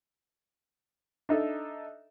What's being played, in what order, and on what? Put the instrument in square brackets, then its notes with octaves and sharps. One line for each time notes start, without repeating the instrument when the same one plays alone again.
[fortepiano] D4 D#4 A4 E5